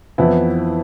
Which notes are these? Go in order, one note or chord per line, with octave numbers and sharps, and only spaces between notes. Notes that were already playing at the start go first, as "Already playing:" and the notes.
F2 E3 B3 E4